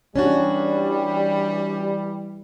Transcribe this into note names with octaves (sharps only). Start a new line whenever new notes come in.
E3 G3 C#4 D4 F#4